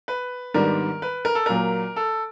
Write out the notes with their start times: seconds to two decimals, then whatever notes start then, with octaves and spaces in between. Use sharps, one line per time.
0.08 B4
0.54 G#2 D#3 G3 B3 D4 A#4
1.02 B4
1.25 A#4
1.35 A4
1.46 A#2 F#3 A#3 A#4
1.96 A4